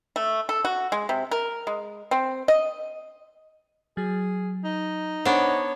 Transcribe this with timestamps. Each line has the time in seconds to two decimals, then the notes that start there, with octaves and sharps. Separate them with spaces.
0.16 A3
0.49 A4
0.65 F#4
0.92 G#3
1.09 C3
1.31 A#4
1.67 G#3
2.11 C4
2.48 D#5
3.97 F#3 G#4
4.65 D#4
5.25 B3 D4 C5 C#5